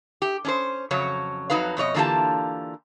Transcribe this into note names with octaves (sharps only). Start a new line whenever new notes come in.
G4
C#4 D4 C5
F2 C#3 F#3 C#4 C#5
F2 F#3 D#4 B4 F5
F2 B2 C#5 D#5
D3 E3 A#3 F4 G4 A5